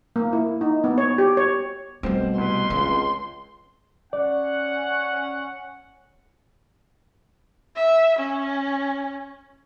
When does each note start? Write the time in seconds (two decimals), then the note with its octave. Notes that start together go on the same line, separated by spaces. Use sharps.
0.16 A#3
0.33 E4
0.61 D#4
0.84 B3
0.98 C#5
1.18 G4
1.37 C#5
2.03 B2 G3 A3 C4 C5
2.38 C2 B4 C6
2.70 C#2 C4
4.13 C#4 D5 F#5
7.76 E5
8.19 C#4